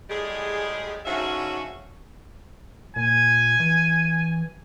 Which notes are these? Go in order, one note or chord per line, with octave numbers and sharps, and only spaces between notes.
A2 G3 G#3 G#4
G#2 D3 C#4 F#4 E5 F5
A#2 G#5
E3